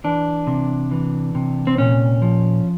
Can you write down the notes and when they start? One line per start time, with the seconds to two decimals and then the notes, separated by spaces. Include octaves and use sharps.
0.04 E3 D4
0.47 C3
0.91 E3
1.35 C3
1.67 C4
1.78 A#2 C#4
2.22 F3